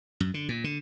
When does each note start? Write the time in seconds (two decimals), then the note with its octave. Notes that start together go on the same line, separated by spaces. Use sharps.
0.20 F#2
0.34 D3
0.49 A#2
0.64 D3